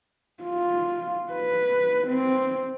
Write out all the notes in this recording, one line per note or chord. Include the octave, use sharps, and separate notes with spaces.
F4
B4
C4